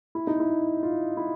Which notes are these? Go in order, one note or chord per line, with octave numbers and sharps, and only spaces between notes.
E4
D#4
E4
F4
E4